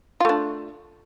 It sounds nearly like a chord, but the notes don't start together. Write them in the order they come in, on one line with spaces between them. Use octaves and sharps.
F4 A3 D4